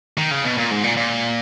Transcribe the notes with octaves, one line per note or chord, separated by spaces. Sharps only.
D#3
C#3
B2
A#2
G#2
A#2
A#2